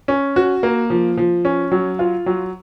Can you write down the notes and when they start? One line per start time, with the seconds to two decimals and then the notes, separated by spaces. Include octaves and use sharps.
0.08 C#4
0.36 F#4
0.63 A#3
0.90 F3
1.17 F3
1.45 C#4
1.72 F#3
1.99 F4
2.26 F#3